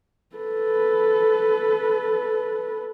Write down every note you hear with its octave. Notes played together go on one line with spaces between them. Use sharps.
A4 B4